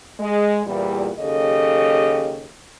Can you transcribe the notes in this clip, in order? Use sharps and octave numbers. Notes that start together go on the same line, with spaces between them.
G#3
E2 A#2 G3
D#2 C#3 F#3 G4 A4 D#5